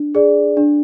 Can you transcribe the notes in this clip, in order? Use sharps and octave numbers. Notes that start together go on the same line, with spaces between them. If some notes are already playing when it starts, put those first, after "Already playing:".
Already playing: D4
G#4 D5
D4